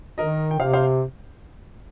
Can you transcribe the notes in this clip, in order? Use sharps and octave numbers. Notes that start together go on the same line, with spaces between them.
D#3 A#4 D#5
G5
C3 C5 F5
C5 F5